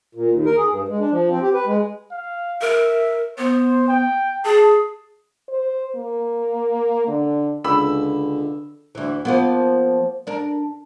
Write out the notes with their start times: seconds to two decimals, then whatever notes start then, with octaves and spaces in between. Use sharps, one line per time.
0.15 A#2
0.31 D#2
0.46 A#4
0.57 G#4
0.69 G2
0.88 G#3
1.00 D4
1.12 F3
1.30 C4
1.42 G4
1.54 B4
1.66 G#3
2.12 F5
2.61 A#4 E5
3.38 B3 C5
3.88 G5
4.45 G#4 A5
5.48 C5
5.95 A#3
7.07 D3
7.64 C#2 D3 B5 E6
8.95 D2 E3
9.25 F3 A#3 B3
10.27 D4 A#4